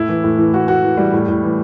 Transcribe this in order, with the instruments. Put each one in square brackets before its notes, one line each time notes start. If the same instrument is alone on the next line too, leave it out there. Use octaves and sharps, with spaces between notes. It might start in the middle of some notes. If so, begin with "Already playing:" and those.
Already playing: [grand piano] A2 E4
E3
A2
E3
A2 F#4
A2 F#4
E3
E3 G3
A2
A2
E3